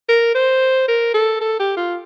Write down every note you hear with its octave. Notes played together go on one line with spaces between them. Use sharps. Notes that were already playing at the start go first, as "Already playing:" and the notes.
A#4
C5
A#4
A4
A4
G4
F4